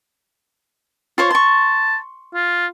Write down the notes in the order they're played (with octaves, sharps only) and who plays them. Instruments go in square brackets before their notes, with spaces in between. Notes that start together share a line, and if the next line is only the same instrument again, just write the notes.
[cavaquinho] F4 C5 C#5
[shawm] A5 [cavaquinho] C6 C#6
[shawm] F4